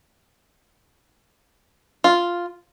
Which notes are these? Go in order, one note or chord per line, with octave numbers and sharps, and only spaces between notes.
F4